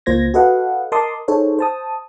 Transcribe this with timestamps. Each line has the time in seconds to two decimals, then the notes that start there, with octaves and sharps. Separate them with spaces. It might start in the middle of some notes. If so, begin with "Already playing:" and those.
0.06 C#2 A#3 F4 C5 G#6 A#6
0.34 F#4 A4 B4 D#5 F5 F#5
0.92 A#4 D#5 A5 C6 D6 D#6
1.28 D#4 G#4 A4 C5 C#5
1.59 C5 A5 D#6